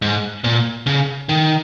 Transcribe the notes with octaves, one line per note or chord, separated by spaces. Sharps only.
G#2
A#2
C#3
D#3